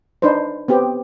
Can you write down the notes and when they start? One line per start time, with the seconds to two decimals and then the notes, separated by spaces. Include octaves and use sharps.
0.22 D4 D#4 B4 C5
0.68 B3 C4 G4